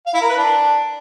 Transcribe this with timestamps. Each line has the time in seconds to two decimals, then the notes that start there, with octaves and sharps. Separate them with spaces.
0.06 F5
0.14 E4
0.21 A#4
0.29 B4
0.36 D4